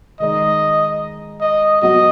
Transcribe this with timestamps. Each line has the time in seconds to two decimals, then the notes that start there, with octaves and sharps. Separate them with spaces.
0.20 D#3 G#3 D#4 D#5
1.41 D#5
1.82 F#3 B3 F#4 D#5